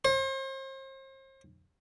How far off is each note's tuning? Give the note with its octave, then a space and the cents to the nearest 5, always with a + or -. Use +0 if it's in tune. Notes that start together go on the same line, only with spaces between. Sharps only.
C5 +40